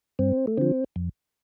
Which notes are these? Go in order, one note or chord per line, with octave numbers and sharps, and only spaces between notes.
G2 C4
A3
D3 F3 C4
F2